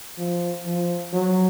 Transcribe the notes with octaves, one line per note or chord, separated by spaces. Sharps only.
F3
F3
F#3